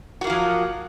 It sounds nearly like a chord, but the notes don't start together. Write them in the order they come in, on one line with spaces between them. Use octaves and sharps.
F#4 A#3 F4 F3 F#3